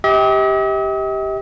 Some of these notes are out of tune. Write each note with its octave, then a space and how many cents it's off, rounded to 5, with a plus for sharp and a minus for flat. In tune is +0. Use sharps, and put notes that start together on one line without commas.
G4 +0 D#5 +45